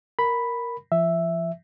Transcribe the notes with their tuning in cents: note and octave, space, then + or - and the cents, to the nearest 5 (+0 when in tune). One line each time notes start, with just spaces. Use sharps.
A#4 +0 B5 +0
F3 -35 E5 +0